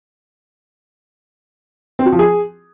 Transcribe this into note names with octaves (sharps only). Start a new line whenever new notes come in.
C4
F#4
F3
G#4